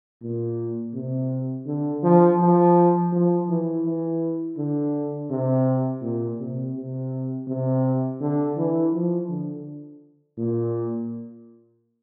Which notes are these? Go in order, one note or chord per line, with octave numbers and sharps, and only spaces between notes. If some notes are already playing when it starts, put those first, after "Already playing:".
A#2
C3
D3
F3
F3
F3
E3
E3
D3
C3
A#2
C3
C3
C3
D3
E3
F3
D3
A#2